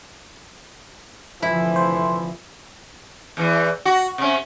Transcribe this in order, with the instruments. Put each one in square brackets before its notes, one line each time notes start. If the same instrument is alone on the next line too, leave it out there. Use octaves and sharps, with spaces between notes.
[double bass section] F1 D3 F3 [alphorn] E3 [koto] E4
[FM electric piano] C5
[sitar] E2 E3
F#4
C3 C#4